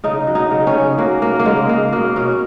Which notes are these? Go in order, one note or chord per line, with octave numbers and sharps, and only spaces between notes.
C#3 D#4
F#3
D#4
C#3
C#4
C#3
F#3 A#3
F#3 A#3
A#3
C#3 G#3
C#3 A#3
B2 A#3
B2 C#4